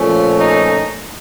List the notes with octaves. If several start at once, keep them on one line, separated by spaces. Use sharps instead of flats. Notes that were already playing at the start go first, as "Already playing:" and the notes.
Already playing: A#2 F3 A3 C#4
D#4